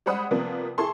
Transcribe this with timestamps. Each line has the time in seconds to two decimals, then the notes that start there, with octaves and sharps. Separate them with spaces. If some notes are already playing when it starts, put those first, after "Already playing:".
0.06 G3 G#3 C5 F#5 B5 D#6
0.31 C3 F3 G3 A#3 B3
0.78 E4 G#4 A4 A5 C6 C#6